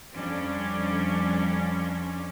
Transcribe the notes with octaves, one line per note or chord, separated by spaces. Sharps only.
F2 G3 C#4 D4